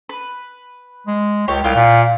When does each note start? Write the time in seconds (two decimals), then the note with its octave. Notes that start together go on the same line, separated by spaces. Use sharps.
0.09 B4
1.07 G#3
1.48 C#2 G4 C#5
1.64 C2 F4 F5 G5
1.75 A#2